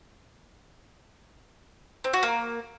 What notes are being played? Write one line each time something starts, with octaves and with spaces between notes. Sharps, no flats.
C4
F#4
A#3